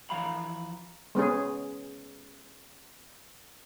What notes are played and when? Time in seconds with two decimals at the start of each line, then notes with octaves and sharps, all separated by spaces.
0.10 E3 F3 F5 A#5 B5
1.15 G#3 B3 C#4 G#4